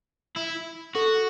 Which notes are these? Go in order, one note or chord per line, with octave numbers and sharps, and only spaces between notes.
E4
F#4 A4